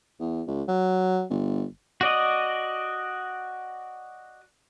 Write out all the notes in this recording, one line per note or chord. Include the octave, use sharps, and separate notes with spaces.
E2
C#2
F#3
G1
F#4 D5 D#5